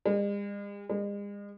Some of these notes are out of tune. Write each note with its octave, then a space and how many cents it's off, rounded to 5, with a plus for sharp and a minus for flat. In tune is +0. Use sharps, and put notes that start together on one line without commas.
G#3 -45
G#3 -40